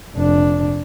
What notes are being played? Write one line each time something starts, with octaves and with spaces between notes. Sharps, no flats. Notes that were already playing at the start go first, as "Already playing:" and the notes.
F1 D4